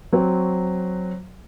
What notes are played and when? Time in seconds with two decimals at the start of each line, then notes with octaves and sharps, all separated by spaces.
0.13 F#3 C4 F#4